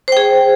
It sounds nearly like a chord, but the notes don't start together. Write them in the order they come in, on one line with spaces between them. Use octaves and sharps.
C5 G5 G#4